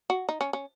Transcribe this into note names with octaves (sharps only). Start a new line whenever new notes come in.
F#4
D#4
C#4
C#4